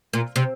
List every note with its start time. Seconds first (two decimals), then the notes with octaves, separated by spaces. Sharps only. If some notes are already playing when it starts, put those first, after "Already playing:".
0.13 A#2
0.36 C3